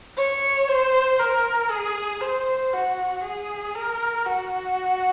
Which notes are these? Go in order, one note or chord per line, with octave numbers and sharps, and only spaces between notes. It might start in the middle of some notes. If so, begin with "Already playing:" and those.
C#5
C5
A#4
G#4
C5
F#4
G#4
A#4
F#4